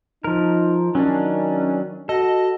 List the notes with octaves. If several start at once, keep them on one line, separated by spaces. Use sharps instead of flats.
F3 D#4 A#4
D#3 F#3 C#4 D4
F#4 A4 D#5